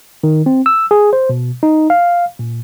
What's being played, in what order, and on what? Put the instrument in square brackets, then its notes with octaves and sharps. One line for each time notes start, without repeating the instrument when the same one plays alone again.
[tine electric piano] D#3
C4
E6
G#4
C5
B2
D#4
F5
A#2